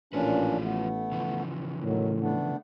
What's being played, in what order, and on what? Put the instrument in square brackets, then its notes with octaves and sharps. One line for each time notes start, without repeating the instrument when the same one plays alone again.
[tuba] A1 [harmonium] A#2 C#4 D4 [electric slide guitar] F3 F4 B4
[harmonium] A3 B3
[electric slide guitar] C#3 E3 F3
[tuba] A2 [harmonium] D#3 F#3
[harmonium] A3 B3 D4